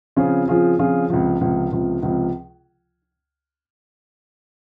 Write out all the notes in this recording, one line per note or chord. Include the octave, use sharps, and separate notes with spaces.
C#3 F3 C4 F4 G#4
C#3 F3 C4 F4 G#4
C#3 F3 C4 F4 G#4
C#2 C3 F3
C#2 C3 F3
C#2 C3 F3
C#2 C3 F3